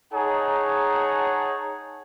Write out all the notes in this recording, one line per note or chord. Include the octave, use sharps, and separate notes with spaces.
D#4 G#4 C#5 F#5 A5 A#5